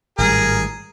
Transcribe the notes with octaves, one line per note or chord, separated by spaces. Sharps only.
G#1 A2 G3 G#4 A#4